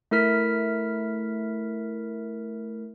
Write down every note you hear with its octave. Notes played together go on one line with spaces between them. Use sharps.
A3 E4 A#4 F6 B6